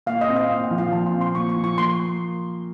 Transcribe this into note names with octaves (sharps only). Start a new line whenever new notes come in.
A#2 F5
D#5
C4
F5
A#2
F#5
F3
F5
A#2 A5
C6
C4
C6
A#2 C#6
C#6
F3
C#6
A#3 C6